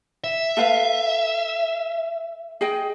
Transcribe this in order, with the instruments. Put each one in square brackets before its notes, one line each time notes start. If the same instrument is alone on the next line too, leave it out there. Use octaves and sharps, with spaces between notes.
[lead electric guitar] E5
[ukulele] A4 B4 F5
G#4 D#5 G5